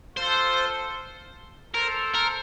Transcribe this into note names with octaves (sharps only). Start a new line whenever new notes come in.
F4 A4 C5
A4 A#4 C5
A#4